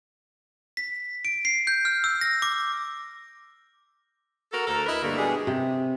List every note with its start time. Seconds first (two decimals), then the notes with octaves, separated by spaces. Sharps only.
0.77 B6
1.25 D7
1.45 C7
1.67 G6
1.85 F6
2.04 E6
2.21 A#6
2.42 D6
4.53 F#4 A4 A#4
4.67 D2 A4 A#4
4.86 E4 A#4 B4 D#5
5.02 G2 D3 A3 A#3
5.17 B2 G3 G#3 D4 G#4
5.47 C3